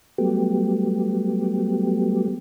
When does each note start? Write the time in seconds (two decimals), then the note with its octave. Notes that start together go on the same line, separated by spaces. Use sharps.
0.18 F#3 G3 A3 B3 G4